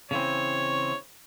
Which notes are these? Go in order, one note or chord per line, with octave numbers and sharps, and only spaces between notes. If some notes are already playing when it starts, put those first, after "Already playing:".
C#3 E3 C4 C#5